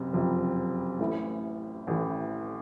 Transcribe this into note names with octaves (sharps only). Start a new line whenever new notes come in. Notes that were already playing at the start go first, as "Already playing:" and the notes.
Already playing: F#1 C3
F#1 F2 C3
A1 A2 E3
A1 A2 E3